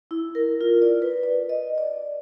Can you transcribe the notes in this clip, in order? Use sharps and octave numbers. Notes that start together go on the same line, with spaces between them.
E4
A#4
F4
D5
B4
D5
D#5
D5